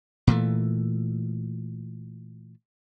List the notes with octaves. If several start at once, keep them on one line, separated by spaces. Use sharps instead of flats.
A#2 E3 A3